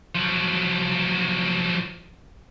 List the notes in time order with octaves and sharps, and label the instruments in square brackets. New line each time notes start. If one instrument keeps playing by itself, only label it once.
[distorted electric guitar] F3 F#3